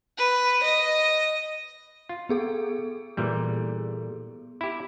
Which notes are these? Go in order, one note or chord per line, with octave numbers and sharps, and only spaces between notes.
B4
D#5
F4
B3 G#4 A4
A#2 E3 G3
E4 G4